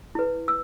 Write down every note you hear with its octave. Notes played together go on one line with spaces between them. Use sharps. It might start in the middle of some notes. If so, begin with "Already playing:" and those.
E4 B4
E6